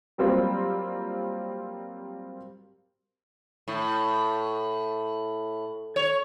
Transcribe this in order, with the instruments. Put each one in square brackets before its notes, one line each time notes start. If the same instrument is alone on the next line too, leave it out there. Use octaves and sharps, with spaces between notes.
[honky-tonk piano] F#3 G3 A#3 C4 F4 C5
[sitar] A2
C#5